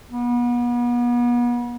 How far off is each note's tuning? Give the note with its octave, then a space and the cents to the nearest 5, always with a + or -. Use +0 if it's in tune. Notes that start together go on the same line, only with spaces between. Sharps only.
B3 -35